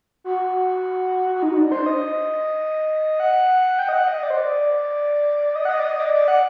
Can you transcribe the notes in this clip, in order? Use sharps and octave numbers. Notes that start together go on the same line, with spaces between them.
F#4
F#4
D#4
D4
C5
D#5
F#5
G5
D#5
F#5
D#5
D5
C5
D5
D#5
F#5
D#5
D5
D#5
D5
D5
F#5